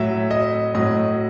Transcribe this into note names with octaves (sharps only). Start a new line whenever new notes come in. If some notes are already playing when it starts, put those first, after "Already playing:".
Already playing: A2 F#3 E5
D#5
A2 F#3 D#5